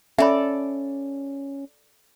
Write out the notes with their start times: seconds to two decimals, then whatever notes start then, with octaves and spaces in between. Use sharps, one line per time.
0.18 C#4 A4 D5 E5 B5